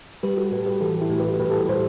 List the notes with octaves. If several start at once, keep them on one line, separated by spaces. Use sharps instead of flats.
G3 G4 B4
F#4 A4
A2 G4 B4
G4 B4
E3 F#4 A4
E4 G4
A2
G4 B4
A2 G4 B4
A4
B4
A2 A4 C5